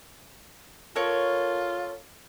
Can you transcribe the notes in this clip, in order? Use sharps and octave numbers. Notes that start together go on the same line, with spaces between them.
F4 A4 A#4 C#5